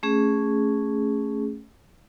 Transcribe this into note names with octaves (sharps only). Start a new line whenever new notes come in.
A3 C#4 G#4